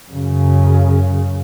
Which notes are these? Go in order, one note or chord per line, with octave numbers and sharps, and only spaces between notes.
F#2 C#3